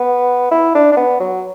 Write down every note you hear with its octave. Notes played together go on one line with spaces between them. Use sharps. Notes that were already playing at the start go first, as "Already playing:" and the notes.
Already playing: B3
E4
D4
D4
B3
F#3